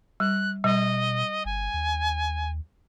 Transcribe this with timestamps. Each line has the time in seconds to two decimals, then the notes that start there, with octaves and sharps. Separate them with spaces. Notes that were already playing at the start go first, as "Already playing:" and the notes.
0.20 G3 F#6
0.64 B2 G3 D#5
1.45 G1 G#5
1.74 D#2